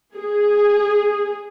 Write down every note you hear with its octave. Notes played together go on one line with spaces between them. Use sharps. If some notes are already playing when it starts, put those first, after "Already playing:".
G#4